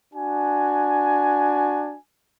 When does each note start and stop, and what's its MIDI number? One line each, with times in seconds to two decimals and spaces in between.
0.14 1.96 62
0.14 1.96 66
0.14 1.96 80